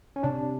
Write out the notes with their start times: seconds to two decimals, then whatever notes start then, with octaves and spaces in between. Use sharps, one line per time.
0.16 C#4
0.23 C3 D4